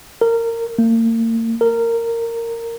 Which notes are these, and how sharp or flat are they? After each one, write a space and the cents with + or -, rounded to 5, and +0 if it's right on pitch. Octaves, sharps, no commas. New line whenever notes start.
A#4 -20
A#3 -40
A#4 -15